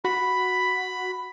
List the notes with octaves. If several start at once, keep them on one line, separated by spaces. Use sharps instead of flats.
F#4 B5